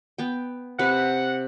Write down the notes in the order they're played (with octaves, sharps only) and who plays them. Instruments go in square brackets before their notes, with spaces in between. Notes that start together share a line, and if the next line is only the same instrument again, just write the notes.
[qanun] B3 G5
[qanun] C3 B4 [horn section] F#5